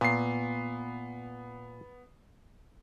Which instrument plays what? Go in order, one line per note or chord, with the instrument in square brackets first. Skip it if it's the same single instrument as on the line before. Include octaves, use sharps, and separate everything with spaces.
[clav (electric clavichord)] A#2 [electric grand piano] B3 C7